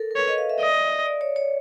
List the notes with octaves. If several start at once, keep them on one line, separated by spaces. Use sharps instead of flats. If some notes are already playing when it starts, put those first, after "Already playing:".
Already playing: A4 A#4
A#4
B4 C#5
D#5
F5
E5
D5 D#5
D5
C#5
C#5